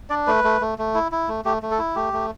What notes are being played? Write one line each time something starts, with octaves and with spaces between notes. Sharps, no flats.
D4 D5
A3 B4
A3
A3
A3
E4
E4
A3
A3 G4
A3
A4
E4
A3 G4
A3